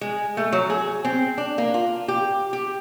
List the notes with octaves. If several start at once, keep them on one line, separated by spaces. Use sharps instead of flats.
G#3
A3
F#3
G#4
C4
D4
A#3
F4
G4
G4